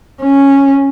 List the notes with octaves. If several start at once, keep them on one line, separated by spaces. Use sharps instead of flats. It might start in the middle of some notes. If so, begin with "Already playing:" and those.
C#4